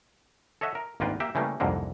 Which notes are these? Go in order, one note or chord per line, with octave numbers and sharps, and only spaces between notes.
A4 C#5 D#5 E5 F#5
A#4
G#1 D2 A#3 F4 B4 G5
A#3 G4 E5 G5
C#3 E3 G3 A3 A#3
C2 F2 G#2 D3 A#3